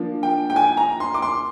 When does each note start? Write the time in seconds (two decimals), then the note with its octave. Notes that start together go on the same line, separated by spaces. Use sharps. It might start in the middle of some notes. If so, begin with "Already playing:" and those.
Already playing: F3 A#3 D4
0.23 G5
0.50 G5
0.56 G#5
0.77 A#5
1.00 C6
1.14 D6
1.22 C6